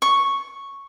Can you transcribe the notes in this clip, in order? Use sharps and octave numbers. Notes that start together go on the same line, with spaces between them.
C#6